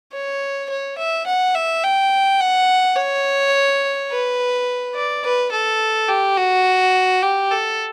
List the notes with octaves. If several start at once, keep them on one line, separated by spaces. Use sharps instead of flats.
C#5
C#5
E5
F#5
E5
G5
F#5
C#5
B4
D5
B4
A4
G4
F#4
G4
A4